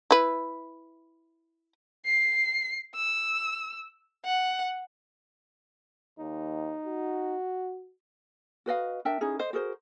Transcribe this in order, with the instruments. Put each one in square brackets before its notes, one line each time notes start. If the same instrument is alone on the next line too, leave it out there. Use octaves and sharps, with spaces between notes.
[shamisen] E4 B4
[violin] C7
E6
F#5
[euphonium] D#2 [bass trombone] D#4
[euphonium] F#4
[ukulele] F#4 B4 D#5 F5
D4 A#4 E5 G5
C#4 D#4 E4 G#4
C5 D#5
F#4 G#4 A#4 C5